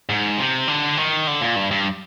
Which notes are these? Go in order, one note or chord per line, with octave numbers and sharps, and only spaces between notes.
G#2
C3
D3
D#3
D3
A#2
G2
G2